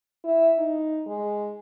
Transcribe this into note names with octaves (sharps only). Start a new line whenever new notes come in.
E4
D#4
G#3